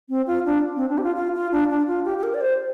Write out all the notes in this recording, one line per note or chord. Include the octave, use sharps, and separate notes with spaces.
C4
F4
D4
C4
D4
G4
F4
F4
F4
D4
D4
F4
G4
G4
A#4
D5
C5